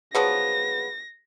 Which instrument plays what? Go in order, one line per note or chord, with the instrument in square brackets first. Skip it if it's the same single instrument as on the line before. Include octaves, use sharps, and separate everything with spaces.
[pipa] F3 F#3 B3 [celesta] G#4 B4 [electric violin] A#6